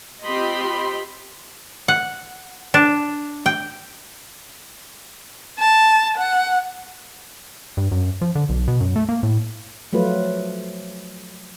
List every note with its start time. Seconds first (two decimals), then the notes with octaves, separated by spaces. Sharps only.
0.23 C4 F4 G4 D#5 B5 C6
1.88 F#5
2.74 D4
3.46 G5
5.59 A5
6.18 F#5
7.77 G2
7.91 F#2
8.21 F3
8.35 D3
8.49 B1
8.68 B2
8.80 F#2
8.96 A3
9.09 A#3
9.23 A2
9.93 F3 F#3 A3 F4 B4